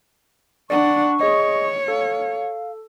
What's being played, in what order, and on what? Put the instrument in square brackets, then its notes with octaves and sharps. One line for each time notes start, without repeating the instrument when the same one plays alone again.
[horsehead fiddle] D4 F#5 [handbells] D5 [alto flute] C#6
[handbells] G#4 D#5 [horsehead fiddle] C#5
[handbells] A4 [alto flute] F5